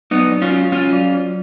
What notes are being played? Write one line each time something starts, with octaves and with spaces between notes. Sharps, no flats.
F#3 B3 D#4
F#3
C#4 F4
F#4
C#4 F4 F#4
F#3
F#3